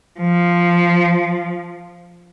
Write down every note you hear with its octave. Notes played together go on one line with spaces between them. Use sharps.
F3